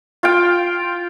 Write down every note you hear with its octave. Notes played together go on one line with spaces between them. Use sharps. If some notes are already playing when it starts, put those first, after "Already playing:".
F4 F5 G5